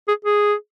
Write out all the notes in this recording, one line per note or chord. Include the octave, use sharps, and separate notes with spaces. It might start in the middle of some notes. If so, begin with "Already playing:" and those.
G#4
G#4